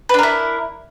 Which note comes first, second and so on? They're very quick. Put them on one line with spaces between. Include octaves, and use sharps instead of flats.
B4 D4 A#4 E4